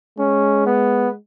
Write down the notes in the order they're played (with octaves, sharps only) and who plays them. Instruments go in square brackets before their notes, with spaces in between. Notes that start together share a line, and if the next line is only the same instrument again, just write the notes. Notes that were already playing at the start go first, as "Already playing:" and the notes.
[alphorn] G#3 [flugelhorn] C#4
[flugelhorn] B3